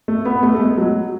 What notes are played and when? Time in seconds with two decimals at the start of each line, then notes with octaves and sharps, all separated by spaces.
0.08 A3
0.25 B3
0.43 A3
0.55 A3
0.60 G#3
0.77 F#3